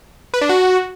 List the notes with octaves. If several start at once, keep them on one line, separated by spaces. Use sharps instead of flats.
B4
D4
F#4